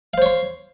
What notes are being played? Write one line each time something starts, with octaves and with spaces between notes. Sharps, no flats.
C5 C#5 F5 C6